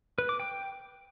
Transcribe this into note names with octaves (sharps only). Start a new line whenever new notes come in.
B4
D6
G5